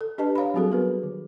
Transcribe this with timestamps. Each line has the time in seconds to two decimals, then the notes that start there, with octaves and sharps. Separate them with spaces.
0.01 A4
0.18 D4 G4 B4 D#5 A5
0.35 C#5 F5 A#5 B5
0.54 F#3 G3 C4 F#4 G#4 A4
0.72 B3 A#4 B4
1.03 D#3